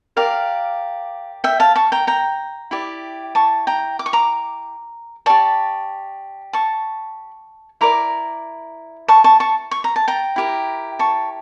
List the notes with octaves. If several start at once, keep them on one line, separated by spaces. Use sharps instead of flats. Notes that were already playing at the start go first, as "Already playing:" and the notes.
G4 A#4 D5 F5
E5 G5
F5 A5
A5 C#6
G5 A#5
G5 A#5
E4 G4 D5
A5 C#6
G5 A#5
D6
C#6
A#5 D6
G4 D5 A5 C#6
A5 C#6
E4 A#4 D5 A#5 D6
A5 C#6
A5 C#6
A5 C#6
C#6
A#5
A5
G5 A#5
E4 G4 A#4
A5 C#6